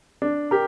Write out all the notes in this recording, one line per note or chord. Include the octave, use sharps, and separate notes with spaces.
D4
G4 A#4